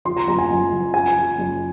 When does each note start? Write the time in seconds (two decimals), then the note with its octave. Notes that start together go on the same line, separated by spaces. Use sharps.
0.05 F3 C6
0.17 A#5
0.27 F#1 A#5
0.38 G#5
0.50 F#1
0.72 F#1
0.93 C#3 G#5
1.16 F3
1.38 F#1